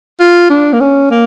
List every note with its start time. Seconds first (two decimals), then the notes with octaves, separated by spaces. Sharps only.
0.20 F4
0.50 D4
0.73 A#3
0.80 C#4
1.11 A#3